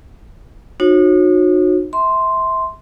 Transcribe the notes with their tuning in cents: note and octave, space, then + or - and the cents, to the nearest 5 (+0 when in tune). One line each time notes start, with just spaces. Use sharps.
D#4 -35 F#4 -30 C#5 -35
E5 -25 C6 -5